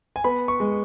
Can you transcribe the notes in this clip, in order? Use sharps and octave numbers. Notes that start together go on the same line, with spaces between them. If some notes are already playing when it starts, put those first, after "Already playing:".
G#5
B3 B5
C#6
G#3